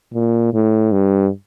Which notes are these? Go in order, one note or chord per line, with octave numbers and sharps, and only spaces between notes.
A#2
A2
G2